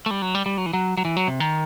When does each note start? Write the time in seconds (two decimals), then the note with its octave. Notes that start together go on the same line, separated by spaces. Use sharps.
0.06 A3
0.11 G3
0.22 F#3
0.35 G3
0.46 G3
0.58 F#3
0.66 E3
0.73 F#3
0.97 F#3
1.05 E3
1.17 F#3
1.27 C3
1.40 D#3